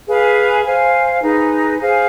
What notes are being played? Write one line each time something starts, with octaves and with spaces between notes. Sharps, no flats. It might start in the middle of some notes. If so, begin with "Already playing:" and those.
G#4 B4 F5
C5 F5 G#5
D#4 G#4 B4
G#4 C5 F5 G#5